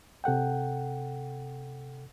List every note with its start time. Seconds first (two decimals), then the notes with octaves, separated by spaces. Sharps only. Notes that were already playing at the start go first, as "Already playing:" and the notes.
0.24 C3 A4 F#5 G5